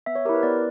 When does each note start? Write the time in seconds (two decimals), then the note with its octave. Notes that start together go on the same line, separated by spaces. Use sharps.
0.06 B3 E5
0.15 C#5
0.25 G4 A#4
0.29 E4
0.34 B4
0.43 B3 D5